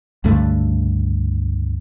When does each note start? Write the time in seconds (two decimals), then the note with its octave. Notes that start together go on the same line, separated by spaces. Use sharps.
0.24 C#2 G2 D3 A3